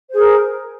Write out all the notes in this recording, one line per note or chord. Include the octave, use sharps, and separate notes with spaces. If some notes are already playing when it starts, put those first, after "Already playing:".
G#4 A#4 C5